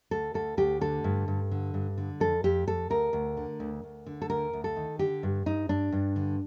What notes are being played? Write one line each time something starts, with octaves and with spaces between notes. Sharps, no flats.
D2 A4
D2 A4
D2 G4
D3 A4
G2
G2
D3
G2
D3
F2 A4
F2 G4
F2 A4
D2 A#4
D2
D3
D2
D2
D3
A4
D2 A#4
D2
A4
D#3
D3 G4
G2
G2 D#4
G2 D4
G2
D3